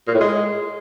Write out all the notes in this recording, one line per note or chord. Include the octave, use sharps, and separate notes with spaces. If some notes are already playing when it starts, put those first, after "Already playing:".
A#2
A2
G#3